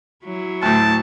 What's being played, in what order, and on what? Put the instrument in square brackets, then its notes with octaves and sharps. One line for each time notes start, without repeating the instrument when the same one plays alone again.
[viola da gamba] F#3 E4
[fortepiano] D2 A2 [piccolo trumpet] A5